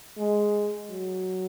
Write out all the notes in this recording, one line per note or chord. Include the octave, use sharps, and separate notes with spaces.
G#3
F#3